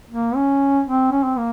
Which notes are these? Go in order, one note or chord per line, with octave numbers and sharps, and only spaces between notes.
A#3
C#4
C4
C#4
C4
A#3